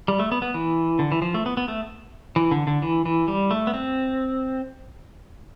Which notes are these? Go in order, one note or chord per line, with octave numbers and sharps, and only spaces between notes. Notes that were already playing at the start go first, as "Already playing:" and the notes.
G3
A3
B3
B3
E3
D3
E3
F3
A3
B3
B3
A3
E3
D3
D3
E3
E3
G3
A3
B3
C4